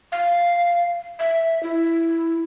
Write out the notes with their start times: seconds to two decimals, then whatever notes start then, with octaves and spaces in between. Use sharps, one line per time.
0.12 F5
1.19 E5
1.63 E4